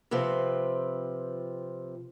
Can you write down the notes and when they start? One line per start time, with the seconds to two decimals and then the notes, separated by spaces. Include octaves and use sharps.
0.11 C3 F3 C4 B4